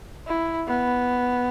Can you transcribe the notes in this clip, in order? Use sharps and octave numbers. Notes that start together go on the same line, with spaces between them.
E4
B3